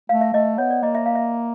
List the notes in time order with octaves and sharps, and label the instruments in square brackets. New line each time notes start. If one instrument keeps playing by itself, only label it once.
[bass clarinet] A3 [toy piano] F5
[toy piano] E5
[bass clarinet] A3 [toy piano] D#5
[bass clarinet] B3 [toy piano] C#5
[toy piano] D5
[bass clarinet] A#3 [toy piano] D#5
[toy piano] E5
F5
E5